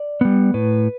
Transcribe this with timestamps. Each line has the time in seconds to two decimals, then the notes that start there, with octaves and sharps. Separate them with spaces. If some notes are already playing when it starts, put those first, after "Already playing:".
Already playing: D5
0.21 G3 B3
0.54 A2 B4